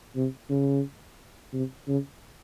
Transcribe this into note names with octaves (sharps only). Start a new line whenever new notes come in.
C3
C#3
C3
C#3